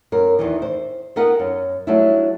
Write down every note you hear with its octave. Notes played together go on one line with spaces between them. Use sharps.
F#2 A#4
E2 D#3 E3
C5
B3 D#4 F4 A#4 B4 F#5
F#2
F#3 G3 A3 D4 E4